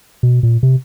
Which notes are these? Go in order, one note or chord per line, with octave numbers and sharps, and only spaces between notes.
B2
A#2
C3